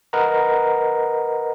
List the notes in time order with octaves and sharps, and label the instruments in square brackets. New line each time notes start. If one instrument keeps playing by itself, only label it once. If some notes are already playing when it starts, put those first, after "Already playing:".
[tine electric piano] A#4 B4 D#5 F#5 A#5